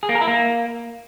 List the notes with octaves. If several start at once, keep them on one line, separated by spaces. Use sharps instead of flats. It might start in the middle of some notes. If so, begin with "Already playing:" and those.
G#4
A#3
A#4
E4
A#3